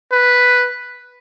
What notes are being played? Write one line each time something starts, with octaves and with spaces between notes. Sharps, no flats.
B4